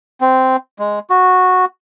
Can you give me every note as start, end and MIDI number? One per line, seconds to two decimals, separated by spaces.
0.21 0.56 60
0.79 0.99 56
1.10 1.65 66